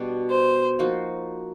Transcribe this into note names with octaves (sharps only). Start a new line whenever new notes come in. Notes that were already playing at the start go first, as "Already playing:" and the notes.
Already playing: B2 G3 B3 D4
C5
F3 A#3 D#4 F#4